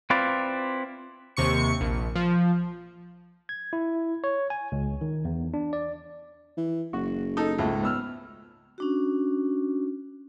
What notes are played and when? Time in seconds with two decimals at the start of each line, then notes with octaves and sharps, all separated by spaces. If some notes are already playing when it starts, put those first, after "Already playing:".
0.10 C4 E4 F4 B4 D5
1.37 D#2 C3 C#6 C#7
1.81 A#1
2.15 F3
3.49 G#6
3.73 E4
4.24 C#5
4.50 G#5
4.72 C#2
5.01 D#3
5.25 E2
5.54 D4
5.73 D5
6.57 E3
6.93 F#1 F#4
7.37 D#4 A4
7.58 C#2 G#2 A3
7.83 B3 E6 F6
8.78 C#4 D4 F#4